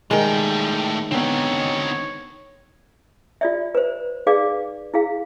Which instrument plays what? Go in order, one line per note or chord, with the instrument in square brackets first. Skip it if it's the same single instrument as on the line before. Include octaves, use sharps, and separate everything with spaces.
[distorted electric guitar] A2 G5 [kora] D#3 G#3 [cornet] G3
[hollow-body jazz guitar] D3 B3 [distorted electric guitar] C4 D#4 [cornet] C#5
[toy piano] F4 D5 E5
B4 C5
D#4 G#4 B4 D5 F5 D6
E4 G#4 F5